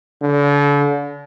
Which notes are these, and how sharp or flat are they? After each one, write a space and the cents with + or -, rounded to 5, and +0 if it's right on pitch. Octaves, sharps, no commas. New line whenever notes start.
D3 -40